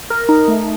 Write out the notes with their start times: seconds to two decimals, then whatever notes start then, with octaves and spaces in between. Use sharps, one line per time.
0.10 A#4
0.29 D#4
0.48 A3